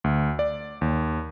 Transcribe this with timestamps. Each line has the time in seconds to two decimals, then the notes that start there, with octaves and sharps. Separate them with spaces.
0.04 D2
0.39 D5
0.81 D#2